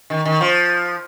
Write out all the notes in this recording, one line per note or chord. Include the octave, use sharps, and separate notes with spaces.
D#3
D#3
F3